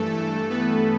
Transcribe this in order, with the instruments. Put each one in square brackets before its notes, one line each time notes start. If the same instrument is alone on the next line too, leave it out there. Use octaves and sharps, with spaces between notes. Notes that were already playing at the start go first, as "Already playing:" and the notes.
Already playing: [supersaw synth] G2 E3 A3 A4
B3 B4